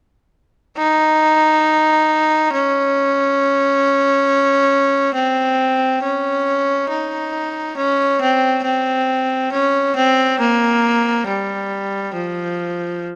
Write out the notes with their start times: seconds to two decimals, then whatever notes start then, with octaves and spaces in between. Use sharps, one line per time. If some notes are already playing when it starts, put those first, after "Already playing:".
0.78 D#4
2.53 C#4
5.15 C4
6.03 C#4
6.90 D#4
7.77 C#4
8.21 C4
8.64 C4
9.52 C#4
9.96 C4
10.40 A#3
11.27 G3
12.15 F3